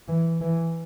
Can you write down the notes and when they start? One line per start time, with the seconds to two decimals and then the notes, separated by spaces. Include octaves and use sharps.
0.08 E3
0.41 E3